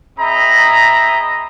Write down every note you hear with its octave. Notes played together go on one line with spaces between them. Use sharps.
C4 G#4 D#5 E5 A#5 B5